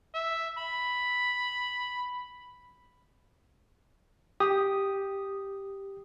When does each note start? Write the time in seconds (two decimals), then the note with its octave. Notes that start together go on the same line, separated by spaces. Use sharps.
0.14 E5
0.58 B5
4.40 G4 D#6